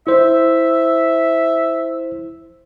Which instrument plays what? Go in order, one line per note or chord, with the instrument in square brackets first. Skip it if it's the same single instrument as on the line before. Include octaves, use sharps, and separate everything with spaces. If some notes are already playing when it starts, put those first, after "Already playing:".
[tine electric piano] E4 C5 [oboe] E5